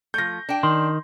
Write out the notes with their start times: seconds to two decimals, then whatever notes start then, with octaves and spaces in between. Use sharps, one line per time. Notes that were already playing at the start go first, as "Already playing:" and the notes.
0.14 F3 A3 G6 A#6
0.49 D4 G5
0.63 D#3 C6